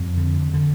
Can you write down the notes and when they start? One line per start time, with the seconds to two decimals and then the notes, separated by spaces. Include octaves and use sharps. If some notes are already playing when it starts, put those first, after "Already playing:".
Already playing: F2 C4
0.17 D3
0.54 D3